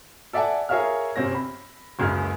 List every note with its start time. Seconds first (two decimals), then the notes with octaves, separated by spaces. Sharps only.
0.33 A4 D5 E5 F#5 G#5 A5
0.69 G#4 A#4 C#5 E5 F5 F6
1.16 G1 C3 C4 C#4 A#6
1.35 B5
1.99 F#1 C#2 F#2 G#3 F6